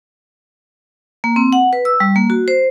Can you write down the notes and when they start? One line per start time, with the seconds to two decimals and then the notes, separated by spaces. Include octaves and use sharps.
1.24 A#3
1.36 C4
1.53 F#5
1.73 B4
1.85 E6
2.00 G3
2.16 A#3
2.30 F#4
2.48 C5